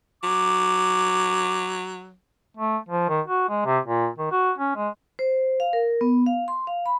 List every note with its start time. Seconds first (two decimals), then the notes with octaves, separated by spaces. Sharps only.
0.23 F#3 D6
2.57 A3
2.89 F3
3.09 D#3
3.27 F#4
3.49 G#3
3.66 C3
3.85 A#2
4.18 D#3
4.32 F#4
4.58 C#4
4.76 G#3
5.19 C5
5.60 F5
5.73 A#4
6.01 B3
6.26 F5
6.48 C6
6.67 F5
6.86 B5